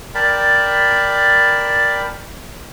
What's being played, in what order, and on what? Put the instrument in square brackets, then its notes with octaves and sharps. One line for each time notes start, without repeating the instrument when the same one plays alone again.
[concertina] A#4 D5 G5 A5 B5